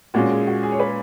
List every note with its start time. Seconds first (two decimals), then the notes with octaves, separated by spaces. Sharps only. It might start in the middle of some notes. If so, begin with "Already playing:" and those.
0.14 A#2 G#3 C#4 F#4
0.30 G#4
0.47 F#4
0.63 G#4
0.72 C#5
0.79 B4